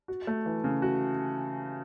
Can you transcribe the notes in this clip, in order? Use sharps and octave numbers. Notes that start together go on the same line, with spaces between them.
F#4
A3
E3
C#3
F#4